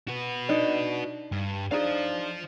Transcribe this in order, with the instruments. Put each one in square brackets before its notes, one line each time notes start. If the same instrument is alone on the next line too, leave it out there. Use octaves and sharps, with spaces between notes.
[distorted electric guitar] F#4 B4
[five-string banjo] D4 D#4
[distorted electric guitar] G2
[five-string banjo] D4 D#4 G#4 [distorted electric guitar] C5 F5